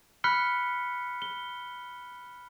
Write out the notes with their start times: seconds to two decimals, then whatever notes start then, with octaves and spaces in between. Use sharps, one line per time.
0.24 B5 F6 F#6 B6 C#7 G7
1.22 G7